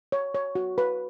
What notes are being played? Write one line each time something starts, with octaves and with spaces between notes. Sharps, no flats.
C#5
C#5
F#4
B4